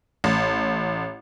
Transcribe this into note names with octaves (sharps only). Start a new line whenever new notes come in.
A1